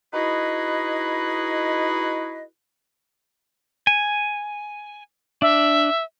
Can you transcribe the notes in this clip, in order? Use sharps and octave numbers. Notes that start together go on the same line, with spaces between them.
D#4 E4 F#4 G#4 B4 D#5
G#5
D4 E5